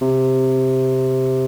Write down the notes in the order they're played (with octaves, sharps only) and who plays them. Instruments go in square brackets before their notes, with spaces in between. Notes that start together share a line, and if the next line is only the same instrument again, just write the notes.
[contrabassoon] C3